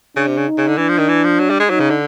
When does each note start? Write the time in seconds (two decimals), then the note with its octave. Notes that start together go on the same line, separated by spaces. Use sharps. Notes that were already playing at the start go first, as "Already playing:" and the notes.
0.17 C#3 D4
0.27 C3
0.38 C#3
0.47 D#4
0.58 C#3
0.68 D3
0.78 E3 D4
0.89 F3
0.99 D#3
1.09 E3
1.24 F3
1.40 F#3
1.50 G3
1.60 G#3
1.70 F#3 D#4
1.80 C#3
1.90 D3